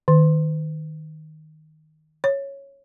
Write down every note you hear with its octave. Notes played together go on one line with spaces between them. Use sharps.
D#3
C#5